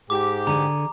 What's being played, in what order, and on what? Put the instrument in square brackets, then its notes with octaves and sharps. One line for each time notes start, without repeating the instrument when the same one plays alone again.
[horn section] G#2 G4 [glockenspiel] D6
[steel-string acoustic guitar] D3 G#4 [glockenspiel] A#5